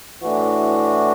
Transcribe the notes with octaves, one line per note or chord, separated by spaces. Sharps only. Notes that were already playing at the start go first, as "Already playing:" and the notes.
A2 E3 D4 F#4